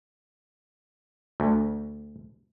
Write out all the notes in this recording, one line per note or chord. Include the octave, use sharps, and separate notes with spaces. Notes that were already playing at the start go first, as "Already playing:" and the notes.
D2